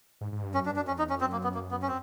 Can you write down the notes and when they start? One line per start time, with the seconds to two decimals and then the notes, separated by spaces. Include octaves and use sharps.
0.21 G#2
0.32 G#2
0.43 G2
0.54 F#2 C#4
0.66 D4
0.70 G2
0.76 D4
0.79 F#2
0.87 F2 C#4
0.99 D#4
1.01 E2
1.10 F2 C#4
1.21 F#2 C4
1.32 A#3
1.43 B3
1.54 A#3
1.71 B3
1.82 C#4
1.88 C4